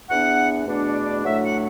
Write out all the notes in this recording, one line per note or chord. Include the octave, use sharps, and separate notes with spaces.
E2 E3 B3 D4 F#5
E2 B2 A3 D4
D5
D5
A2 F#3 A3 D4 E5
F#5